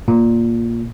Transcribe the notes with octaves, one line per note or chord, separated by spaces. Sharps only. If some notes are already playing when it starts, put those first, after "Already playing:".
A#2